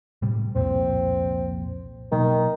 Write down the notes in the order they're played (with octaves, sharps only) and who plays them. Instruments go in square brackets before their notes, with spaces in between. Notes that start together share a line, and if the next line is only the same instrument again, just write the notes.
[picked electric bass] A2 C3 G3
[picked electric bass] C2 F2 A#2 [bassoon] C4
[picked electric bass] B2 F#3 A#3 [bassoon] D#3